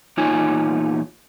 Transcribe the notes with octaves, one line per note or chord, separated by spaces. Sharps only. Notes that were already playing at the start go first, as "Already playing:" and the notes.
E2 A#2 D#4 F4 C#5 G#5